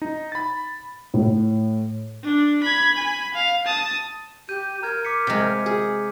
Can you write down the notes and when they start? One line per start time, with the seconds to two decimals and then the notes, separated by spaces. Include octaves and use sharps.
0.02 D#4
0.32 B5 A6
1.14 A2
2.24 D4
2.63 B5 G#6
2.94 G#5 B5
3.34 F5
3.66 A5 D#6
4.49 G4 G6 D#7
4.83 A#4 A#5 F6 G#6
5.05 D6 B6 C#7
5.27 C3 G#3 F5 G5
5.66 G#4